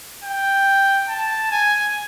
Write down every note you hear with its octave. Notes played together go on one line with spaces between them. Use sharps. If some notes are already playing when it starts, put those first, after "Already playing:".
G5
A5
G#5